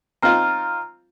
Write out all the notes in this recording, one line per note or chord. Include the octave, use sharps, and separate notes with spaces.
C4 D#4 F4 A#5 F6